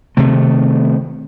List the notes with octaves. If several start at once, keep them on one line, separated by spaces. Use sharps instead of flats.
C3 D#3 A3